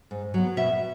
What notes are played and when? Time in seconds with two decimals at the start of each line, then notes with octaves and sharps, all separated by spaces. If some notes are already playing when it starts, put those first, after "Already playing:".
0.11 G#2
0.34 F#3 B3
0.57 B2 E5